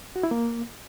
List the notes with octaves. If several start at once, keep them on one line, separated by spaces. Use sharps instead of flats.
F#4
E4
A#3